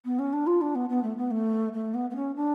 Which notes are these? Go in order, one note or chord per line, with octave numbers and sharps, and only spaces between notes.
B3
C#4
D4
F4
D4
B3
B3
A3
B3
A3
A3
B3
B3
C#4
D4